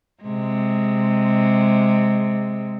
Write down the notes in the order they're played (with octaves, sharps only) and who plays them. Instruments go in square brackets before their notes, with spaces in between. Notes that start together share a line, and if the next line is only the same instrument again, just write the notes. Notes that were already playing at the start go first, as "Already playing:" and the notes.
[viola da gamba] C3 G#3